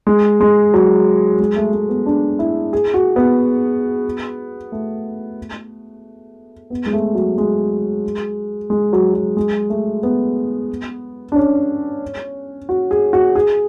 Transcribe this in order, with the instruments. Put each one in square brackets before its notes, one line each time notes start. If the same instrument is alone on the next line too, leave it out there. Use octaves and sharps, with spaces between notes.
[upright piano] G#3
G#3
F#3
G#3
A3
A3
B3
D4
E4
G#4
F#4
B3
A3
B3
G#3
A3
F#3
G#3
G#3
F#3
F#3
G#3
A3
B3
D4
C#4
F#4
G#4
F#4
G#4